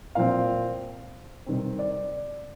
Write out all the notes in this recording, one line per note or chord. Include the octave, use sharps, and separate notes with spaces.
A#2 F3 C4 F5
C3 D#3 G3 C4
D5